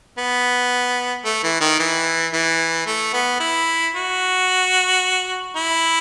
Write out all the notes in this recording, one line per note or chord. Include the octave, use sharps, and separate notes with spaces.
B3
A3
E3
D#3
E3
E3
A3
B3
E4
F#4
E4